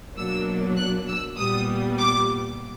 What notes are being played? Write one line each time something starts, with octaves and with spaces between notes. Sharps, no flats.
B2 F#3 A#3 D4 E6
F#6
E6
A#2 G3 B3 D#6
D6